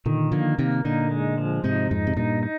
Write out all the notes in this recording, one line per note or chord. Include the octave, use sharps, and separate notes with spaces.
A#2 D3 D#3
D3 F3 A#3
C3 D#3 A#3
A#2 D3 D#4
G#3
F3
G#2 C3 D#4
F2 G#2 D#4
C3
G2 A#2 D#4
D#4